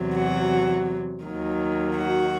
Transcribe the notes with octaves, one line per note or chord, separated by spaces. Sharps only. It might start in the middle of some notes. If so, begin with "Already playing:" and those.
Already playing: E2 C3 F#3
F#4
D#2 D#3 F#3
F#4